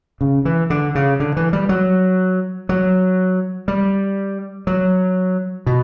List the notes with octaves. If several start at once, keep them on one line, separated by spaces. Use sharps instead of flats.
C#3
E3
D3
C#3
D3
E3
G3
F#3
F#3
G3
F#3
B2